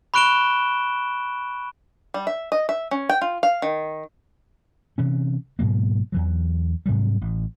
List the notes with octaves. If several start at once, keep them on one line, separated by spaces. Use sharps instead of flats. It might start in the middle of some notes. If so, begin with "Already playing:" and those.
B5 C#6 F#6 D7 E7 G7
G3
E5
D#5
E5
C#4
G5
F4
F5
D#3
C3 E3 C#4
G#2 B2 F#3 A#3
E2 E3 F#3
G#2 C3 F#3 G3
A1